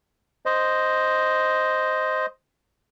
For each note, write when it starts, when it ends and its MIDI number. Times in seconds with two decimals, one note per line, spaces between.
0.46 2.26 72
0.46 2.26 75